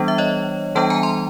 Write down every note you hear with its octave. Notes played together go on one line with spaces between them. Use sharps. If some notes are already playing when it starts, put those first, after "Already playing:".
Already playing: E3 G3 B3 D4
E5
C#5 D#5
E3 G3 B3 D4 G5 A5
G#5 A#5
A#5 C6